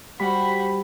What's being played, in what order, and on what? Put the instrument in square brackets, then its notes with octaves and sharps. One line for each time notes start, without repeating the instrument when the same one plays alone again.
[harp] G3 [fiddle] F#4 C5 [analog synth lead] B5